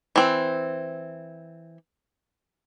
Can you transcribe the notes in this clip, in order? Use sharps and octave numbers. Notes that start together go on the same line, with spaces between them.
E3 C4